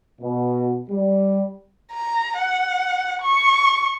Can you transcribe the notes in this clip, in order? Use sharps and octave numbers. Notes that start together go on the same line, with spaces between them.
B2
G3
A#5
F#5
C#6